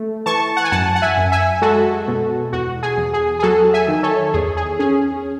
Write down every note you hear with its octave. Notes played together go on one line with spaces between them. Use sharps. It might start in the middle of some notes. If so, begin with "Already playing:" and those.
Already playing: A3
E3 A5 C#6
F#5
G#5
F#2 F#5 A5
F#5
E5 G#5
F#2
E5 G#5
G#3 F#4 A4
B2
E2 F#4
G#4
E2
G#4
G#4
F#3 F#4 A4
E5 G#5
D#3
A4 C#5
E2 G#4
G#4
C#4 G#4